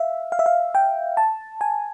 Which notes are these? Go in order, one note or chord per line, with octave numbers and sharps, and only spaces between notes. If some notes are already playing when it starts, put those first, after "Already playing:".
Already playing: E5 F5
F5
E5
F5
G5
A5
G#5